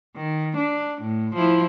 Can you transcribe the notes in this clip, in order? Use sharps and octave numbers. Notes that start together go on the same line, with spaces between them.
D#3
D4
A2
F3 E4